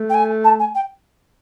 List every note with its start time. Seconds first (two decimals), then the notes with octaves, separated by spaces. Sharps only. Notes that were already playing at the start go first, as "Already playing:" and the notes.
Already playing: A3
0.10 G5
0.14 G#5
0.44 A5
0.59 G#5
0.75 G5